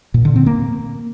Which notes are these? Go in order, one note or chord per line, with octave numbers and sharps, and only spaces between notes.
A#2
D3
C4
A#3